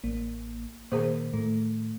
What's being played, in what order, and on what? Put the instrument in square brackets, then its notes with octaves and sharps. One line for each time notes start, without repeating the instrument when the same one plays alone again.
[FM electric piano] A1 A#3
[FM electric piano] A#2 A#3 [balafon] D#3 G#4 C5
[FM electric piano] A2 A3